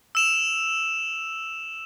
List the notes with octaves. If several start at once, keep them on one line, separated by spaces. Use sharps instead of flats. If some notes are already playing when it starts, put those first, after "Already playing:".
E6 E7 F7